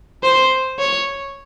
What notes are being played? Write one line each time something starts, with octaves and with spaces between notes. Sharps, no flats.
C5
C#5